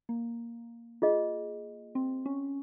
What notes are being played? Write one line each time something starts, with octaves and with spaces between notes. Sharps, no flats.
A#3
F4 G#4 D#5
C4
C#4